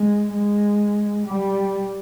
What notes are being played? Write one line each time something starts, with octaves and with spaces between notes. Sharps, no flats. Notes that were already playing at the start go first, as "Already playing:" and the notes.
Already playing: G#3
G#3
G3